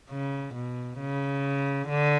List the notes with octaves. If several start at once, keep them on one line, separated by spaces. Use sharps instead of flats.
C#3
B2
C#3
D3